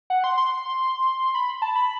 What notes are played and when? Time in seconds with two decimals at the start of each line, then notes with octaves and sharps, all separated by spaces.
0.10 F#5
0.24 C6
0.37 C6
1.35 B5
1.62 A5
1.76 B5